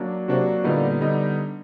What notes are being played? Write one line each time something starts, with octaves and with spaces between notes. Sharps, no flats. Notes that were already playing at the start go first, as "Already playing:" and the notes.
Already playing: F#3 A#3 D4
C3 F#3 A#3 D4 F#4
A#2 D3 G3 B3 D#4
D3 G3 B3 D#4